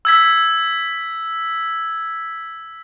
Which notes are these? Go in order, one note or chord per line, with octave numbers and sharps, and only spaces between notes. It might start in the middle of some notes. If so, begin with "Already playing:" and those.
E6 G#6 B6